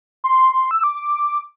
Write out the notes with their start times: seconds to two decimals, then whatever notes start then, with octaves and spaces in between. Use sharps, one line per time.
0.24 C6
0.71 E6
0.84 D6